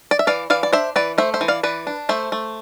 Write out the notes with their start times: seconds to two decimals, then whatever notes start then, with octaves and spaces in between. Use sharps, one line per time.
0.11 D5
0.19 E5
0.27 E3 D5 F5
0.50 E3 D5 F5
0.63 D5
0.73 D4 C5 E5
0.96 E3 B4 D5
1.18 A3 C5 E5
1.34 C5 E5
1.41 E3
1.48 D5 F5
1.63 E3 B4 D5
1.87 D4
2.09 A3 C5 E5
2.32 A3